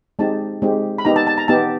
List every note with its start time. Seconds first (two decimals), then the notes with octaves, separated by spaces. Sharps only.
0.19 G#3 C4 D#4 G4 A5
0.62 G#3 C4 D#4 G4
0.98 B5
1.05 B3 D#4 G4 A#5
1.16 A5
1.27 A5
1.38 A#5
1.48 B3 D#4 G4 A5